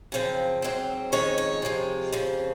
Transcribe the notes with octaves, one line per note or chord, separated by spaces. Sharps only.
F#2 C#3 F3 C4
G#2 F#3 C4
F2 D#3 G#3 C#4 C#5
C#5
C3 F3 G#3
F2 C#3 F3